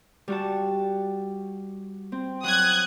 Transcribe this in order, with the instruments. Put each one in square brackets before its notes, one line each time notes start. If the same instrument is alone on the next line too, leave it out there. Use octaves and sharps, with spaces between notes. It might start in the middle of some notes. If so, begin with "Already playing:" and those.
[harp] G3 F#4 A5
C4
[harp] F#3 [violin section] D#6 F#6 G#6